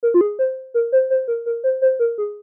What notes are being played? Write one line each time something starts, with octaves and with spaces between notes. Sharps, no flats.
A#4
F4
G#4
C5
A#4
C5
C5
A#4
A#4
C5
C5
A#4
G#4